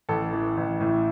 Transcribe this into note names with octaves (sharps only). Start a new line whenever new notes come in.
A1 A4
E3
A1
A2